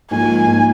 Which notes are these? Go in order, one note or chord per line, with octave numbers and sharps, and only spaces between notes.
G#2 F3 A#3 D#4 G#5
G#2 F3 A#3 D#4